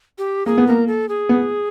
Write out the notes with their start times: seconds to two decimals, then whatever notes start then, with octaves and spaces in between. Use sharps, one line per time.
0.19 G4
0.46 A#3 G#4
0.58 B3
0.67 A#3 A#4
0.87 A4
1.09 G#4
1.29 B3